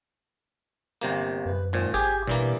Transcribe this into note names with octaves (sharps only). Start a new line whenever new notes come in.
G1 C3 A#3
F#2 B4
G#1 A#2 C5
G#1 G4 G#4 G#5
G2 B2 E3 A#3 D5